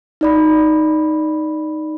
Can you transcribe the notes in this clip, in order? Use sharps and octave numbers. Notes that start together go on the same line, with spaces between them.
D#4 D5 B5